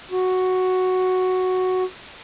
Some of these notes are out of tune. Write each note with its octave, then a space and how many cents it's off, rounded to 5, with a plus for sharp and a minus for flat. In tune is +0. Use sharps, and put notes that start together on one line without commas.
F#4 +0